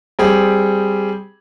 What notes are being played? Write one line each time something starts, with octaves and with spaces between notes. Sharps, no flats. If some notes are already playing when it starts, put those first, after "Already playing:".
G3 C4 G4 G#4